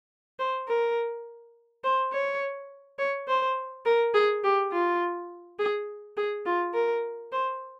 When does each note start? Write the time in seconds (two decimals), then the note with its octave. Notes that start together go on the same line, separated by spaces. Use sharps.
0.39 C5
0.68 A#4
1.84 C5
2.12 C#5
2.99 C#5
3.28 C5
3.85 A#4
4.15 G#4
4.44 G4
4.72 F4
5.59 G#4
6.17 G#4
6.46 F4
6.74 A#4
7.32 C5